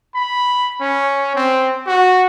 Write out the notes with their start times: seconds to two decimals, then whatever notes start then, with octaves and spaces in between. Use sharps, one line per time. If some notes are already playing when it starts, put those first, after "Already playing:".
0.15 B5
0.81 C#4
1.36 C4
1.86 F#4